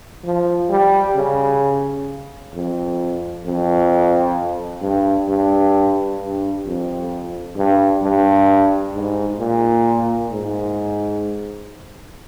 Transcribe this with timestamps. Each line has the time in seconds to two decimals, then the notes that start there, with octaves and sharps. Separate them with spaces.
0.24 F3
0.70 G3
1.16 C#3
2.54 F2
3.45 F2
4.82 G2
5.28 G2
6.20 G2
6.65 F2
7.56 G2
8.02 G2
8.94 G#2
9.39 A#2
10.31 G#2